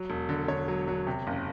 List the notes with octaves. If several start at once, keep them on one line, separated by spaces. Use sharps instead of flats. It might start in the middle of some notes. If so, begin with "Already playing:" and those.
Already playing: F#3
E1
D3
D3 C#5
F#3
F#3
C3
F#1